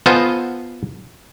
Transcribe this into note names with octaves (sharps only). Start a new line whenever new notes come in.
B3 F4 A4 C5 D#5 G#5